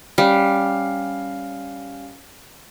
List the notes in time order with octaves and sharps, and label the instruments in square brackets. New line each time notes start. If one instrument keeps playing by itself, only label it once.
[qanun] G3 [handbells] C#4 F5 F6